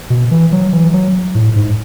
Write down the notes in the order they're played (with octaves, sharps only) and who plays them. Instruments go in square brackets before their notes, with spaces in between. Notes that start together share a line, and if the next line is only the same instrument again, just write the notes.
[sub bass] B2
E3
F#3
E3
F#3
A2
G#2